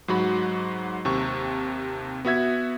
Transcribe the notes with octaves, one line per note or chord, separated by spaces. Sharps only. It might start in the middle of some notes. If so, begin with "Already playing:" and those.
G#2 F#3 F#4 B5
D#2 C3 C#6
B3 F#4 E5 G#6